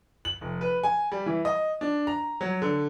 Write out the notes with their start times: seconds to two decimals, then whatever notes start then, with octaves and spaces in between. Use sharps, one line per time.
0.25 F#7
0.41 F1
0.61 B4
0.83 G#5
1.12 G3
1.26 E3
1.45 D#5
1.81 D4
2.07 A#5
2.41 F#3
2.62 D3